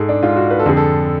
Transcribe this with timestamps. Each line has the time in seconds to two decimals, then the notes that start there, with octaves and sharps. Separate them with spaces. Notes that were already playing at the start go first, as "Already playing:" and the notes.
Already playing: G#2 G#4 A4
0.09 D4
0.22 G#2 F4
0.36 F#4
0.51 B4
0.59 A4
0.66 F2 D3 G#4
0.77 A4